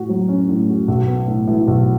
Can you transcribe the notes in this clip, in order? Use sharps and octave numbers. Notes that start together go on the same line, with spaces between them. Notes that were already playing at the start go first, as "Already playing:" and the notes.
Already playing: A2 F#4
F#3
C#4
A2
F#4
B1
B3
A2
E3
B1